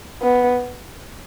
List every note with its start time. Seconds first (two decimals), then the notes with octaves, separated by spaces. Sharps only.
0.22 B3